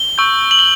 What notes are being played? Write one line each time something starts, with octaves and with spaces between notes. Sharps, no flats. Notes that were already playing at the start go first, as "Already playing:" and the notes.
Already playing: G7
C#6 E6 G6
F#7
G7